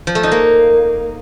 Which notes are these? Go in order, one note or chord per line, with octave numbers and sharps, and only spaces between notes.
F3
A3
D#4
A#3